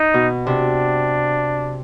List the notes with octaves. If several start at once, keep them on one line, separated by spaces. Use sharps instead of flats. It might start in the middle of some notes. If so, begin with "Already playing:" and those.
Already playing: D#4
B2
C3 D4